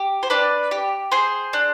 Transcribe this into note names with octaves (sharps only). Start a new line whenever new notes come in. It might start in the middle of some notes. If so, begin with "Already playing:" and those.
Already playing: G4
C5
D4 B4 D5
G4
G#4 C5
D4